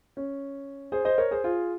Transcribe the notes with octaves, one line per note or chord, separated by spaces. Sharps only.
C#4
G#4 C5
C5 D#5
A#4 C#5
G#4 C5
F4 G#4